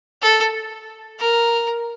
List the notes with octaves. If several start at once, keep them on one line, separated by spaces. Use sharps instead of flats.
A4
A#4